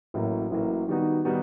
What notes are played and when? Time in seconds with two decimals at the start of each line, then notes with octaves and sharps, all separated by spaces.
0.14 A1 A2 F#3 A#3
0.51 A1 A2 F#3 A#3
0.88 D#3 G3 B3 D#4 F#4
1.25 D#3 G3 B3 D#4 F#4